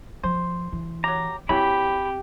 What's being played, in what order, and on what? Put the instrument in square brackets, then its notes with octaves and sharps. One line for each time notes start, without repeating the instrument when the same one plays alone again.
[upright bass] F3 [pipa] C5
[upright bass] E3
[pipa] F#3 G4 [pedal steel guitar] A#5
[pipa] E3 F#3 E4 [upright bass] C4 [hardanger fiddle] G4 [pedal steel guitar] B5